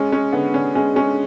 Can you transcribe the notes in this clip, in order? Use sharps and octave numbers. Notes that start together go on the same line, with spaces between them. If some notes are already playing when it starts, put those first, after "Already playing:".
Already playing: G#3 C#4
G#3 C#4
D3 B3
D3 C#4
G#3 C#4
G#3 C#4